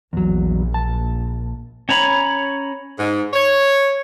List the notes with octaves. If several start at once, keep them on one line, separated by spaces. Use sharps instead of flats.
A#1 E2 F#3
A5
C#4 C#5 A#5 B5
G#2
C#5